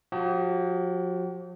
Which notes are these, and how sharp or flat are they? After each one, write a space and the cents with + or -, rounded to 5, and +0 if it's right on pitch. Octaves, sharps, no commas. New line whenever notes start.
F3 +45 G4 -40